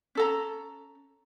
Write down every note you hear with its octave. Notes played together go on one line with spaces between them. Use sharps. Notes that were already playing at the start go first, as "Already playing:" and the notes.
C#4 A4 A#5